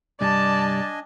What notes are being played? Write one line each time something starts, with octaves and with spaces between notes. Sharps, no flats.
C2 G2 G3 D4 D5 D#5 G#5 A5